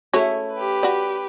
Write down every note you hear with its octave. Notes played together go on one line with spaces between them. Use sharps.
A3 C#4 E4 F#4 G#4 C#5
G4 B4
F#4 D5